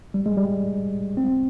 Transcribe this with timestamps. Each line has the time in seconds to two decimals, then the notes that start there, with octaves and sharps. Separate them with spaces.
0.14 G3
0.26 G#3
0.37 G3
1.17 C4